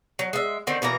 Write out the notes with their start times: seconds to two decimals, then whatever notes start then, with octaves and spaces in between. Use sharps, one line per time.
0.19 F#3
0.33 G#3 E5
0.67 D3 D#3 C4
0.82 B2 E3 A#3 A#5